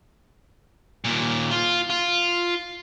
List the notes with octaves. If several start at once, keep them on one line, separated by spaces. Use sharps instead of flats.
D#2 A#2
F4
F4